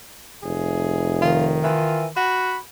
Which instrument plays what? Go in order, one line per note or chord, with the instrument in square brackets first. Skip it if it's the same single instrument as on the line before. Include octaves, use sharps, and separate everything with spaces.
[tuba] F1 [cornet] G#4
[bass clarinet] D#3 [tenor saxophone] F4
[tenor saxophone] E3 [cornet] F4
[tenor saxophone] F#4 [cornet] B5